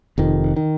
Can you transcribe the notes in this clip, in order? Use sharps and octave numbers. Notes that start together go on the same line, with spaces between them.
F1 F2 D#3
D#3